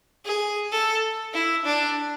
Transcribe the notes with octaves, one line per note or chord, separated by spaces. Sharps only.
G#4
A4
E4
D4